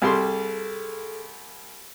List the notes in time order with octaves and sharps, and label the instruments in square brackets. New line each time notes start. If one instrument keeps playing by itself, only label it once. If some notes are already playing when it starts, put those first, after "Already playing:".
[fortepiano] C2 G3 C6 [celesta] G#4 A4